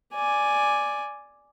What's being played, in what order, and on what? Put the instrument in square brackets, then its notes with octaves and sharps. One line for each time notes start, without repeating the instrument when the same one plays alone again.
[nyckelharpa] D5 G#5